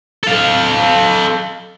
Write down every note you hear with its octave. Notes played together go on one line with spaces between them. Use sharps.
A4 F5